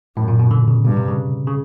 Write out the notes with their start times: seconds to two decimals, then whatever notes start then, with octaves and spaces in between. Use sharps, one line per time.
0.16 F#2 A2
0.28 A#2
0.39 B2
0.51 D3
0.68 C#3
0.85 G2 B2
0.97 C3
1.08 C#3
1.47 C#3